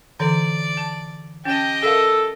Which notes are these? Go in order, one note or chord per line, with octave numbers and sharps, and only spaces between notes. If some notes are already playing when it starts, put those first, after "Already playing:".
D3 E3 D5
A5
C#4 G4 D#5 G5 A5
A4 A#4 E5 F5 E6